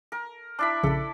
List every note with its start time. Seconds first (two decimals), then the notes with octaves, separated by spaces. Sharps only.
0.12 A#4
0.59 D4 E4 A5 B5
0.83 A#1 C#3 A4 B5